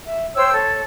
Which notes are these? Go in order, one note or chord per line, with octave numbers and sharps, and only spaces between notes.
E5
C5 C#5 G5 E6
A4 C#5